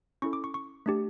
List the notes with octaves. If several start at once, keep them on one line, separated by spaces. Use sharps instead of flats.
C#4 E4 A4 C#6
D6
C#6
C#6
A3 D4 G4